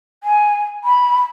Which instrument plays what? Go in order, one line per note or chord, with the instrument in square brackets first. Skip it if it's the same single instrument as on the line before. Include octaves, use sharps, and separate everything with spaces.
[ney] G#5
B5